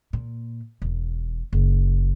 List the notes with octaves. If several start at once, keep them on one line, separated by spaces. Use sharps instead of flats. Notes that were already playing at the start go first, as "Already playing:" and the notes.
A#2
E1
F#1